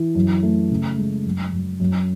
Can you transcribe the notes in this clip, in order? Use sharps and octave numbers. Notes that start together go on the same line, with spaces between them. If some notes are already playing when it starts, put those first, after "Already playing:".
Already playing: E3
F#2
A3
C#3
G#3
F#2
F#2
F#2